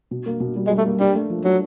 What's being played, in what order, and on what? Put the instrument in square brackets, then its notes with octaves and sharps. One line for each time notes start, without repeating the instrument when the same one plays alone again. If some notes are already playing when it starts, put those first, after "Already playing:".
[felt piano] B2
A#3
B2
G3
[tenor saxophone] G#3
[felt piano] G3
[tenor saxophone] A3
[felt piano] A#3
[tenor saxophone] G3 [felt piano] D4
[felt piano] A3
F3
[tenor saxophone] F#3 [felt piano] D4